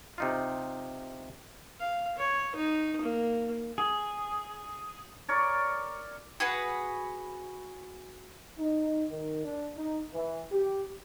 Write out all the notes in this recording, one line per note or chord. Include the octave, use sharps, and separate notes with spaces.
C3 D#4 F4
F5
C#5
D#4
A#3
G#4
A#4 C#5 D5
F#4 G#4 B4 F#5
D#4
D#3
D4
D#4
E3
G4